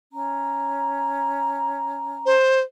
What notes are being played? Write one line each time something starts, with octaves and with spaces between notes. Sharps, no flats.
C#4 A#5
C5